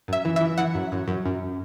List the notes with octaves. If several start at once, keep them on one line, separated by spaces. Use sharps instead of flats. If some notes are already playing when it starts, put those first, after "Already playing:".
F#2 E5
E3
E3 E5
E3 F#5
F#2
F#2
F#2
F#2